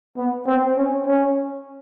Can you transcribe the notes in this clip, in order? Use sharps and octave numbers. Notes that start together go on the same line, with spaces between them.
B3
C4
C#4
C#4